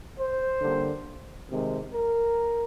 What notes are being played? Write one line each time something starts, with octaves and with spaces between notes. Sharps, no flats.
C5
D3 G3 A#3
C3 D#3 G#3
A#4